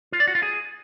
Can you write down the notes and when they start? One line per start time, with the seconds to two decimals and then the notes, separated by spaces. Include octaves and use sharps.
0.12 F4
0.20 D5
0.27 F#4
0.35 F4
0.42 G#4